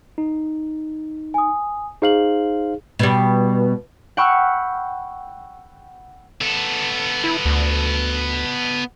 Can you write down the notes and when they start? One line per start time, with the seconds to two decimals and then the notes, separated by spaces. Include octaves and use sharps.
0.18 D#4
1.34 G#5 D#6
2.02 D#4 G#4 C5 F5 F#7
2.99 B2 G3
4.17 F#5 G5 B5 C#6 E6 F6
6.41 B3 A4
7.24 E4
7.45 D2